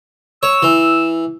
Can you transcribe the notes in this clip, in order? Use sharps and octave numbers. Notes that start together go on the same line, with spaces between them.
C#5 E6
E3